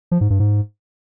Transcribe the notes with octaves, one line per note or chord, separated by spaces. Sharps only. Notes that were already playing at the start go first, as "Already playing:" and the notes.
F3
G#2
G2
G#2